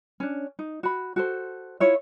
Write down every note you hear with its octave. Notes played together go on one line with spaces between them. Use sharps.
C#4 D4
D#4
F#4 B5
F#4 A4 C5
E4 F4 C#5 E5